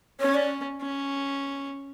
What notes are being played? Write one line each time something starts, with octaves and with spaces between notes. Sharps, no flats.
C#4 C#5
D5
C#4